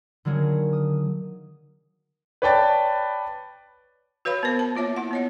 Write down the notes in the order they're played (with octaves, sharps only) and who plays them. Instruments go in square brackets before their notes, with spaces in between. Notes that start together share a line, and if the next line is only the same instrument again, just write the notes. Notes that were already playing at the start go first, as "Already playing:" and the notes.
[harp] D3 D#3 F#3 A#3 G#4
D#6
[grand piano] B4 C#5 D5 G5 A5 A6
[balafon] F#4 B4 C#5 F5 B5
B3 A#4 C5
A5
A#3 F4 C#5 E5
E4 F#5
B3 C#5 D#5